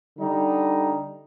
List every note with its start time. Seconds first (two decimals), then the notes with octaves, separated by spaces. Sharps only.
0.18 D3 G3 D#4